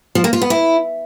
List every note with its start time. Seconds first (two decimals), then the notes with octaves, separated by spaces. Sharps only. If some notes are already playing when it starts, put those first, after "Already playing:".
0.15 F3
0.24 A#3
0.33 F4
0.42 B3
0.50 E4